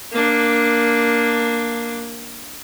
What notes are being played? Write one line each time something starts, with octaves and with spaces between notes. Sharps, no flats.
A#3 D4